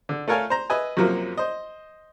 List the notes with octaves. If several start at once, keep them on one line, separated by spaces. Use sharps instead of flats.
D3
A3 A4 A#4 C#5 F5 G#5
C5 A#5
B4 D#5 E5 G#5
F#2 C3 F3 F#3 A#3
C5 D#5